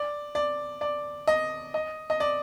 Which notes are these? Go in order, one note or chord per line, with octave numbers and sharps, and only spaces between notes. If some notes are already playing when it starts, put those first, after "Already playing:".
Already playing: D5
D5
D5
D#5
D#5
D#5
D5